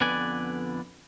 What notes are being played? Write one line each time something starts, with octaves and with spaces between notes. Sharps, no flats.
F2 D3 B3 B4 D5 G#5